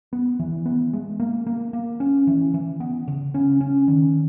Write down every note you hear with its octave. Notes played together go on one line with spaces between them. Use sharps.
B3
E3
B3
G#3
A#3
A#3
A#3
C#4
E3
E3
B3
C#3
C#4
C#4
D#3